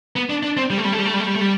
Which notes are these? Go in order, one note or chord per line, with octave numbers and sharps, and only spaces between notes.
B3
D4
D4
C4
G3
A3
G3
A3
G3
A3
G3
A3
G3
A3
G3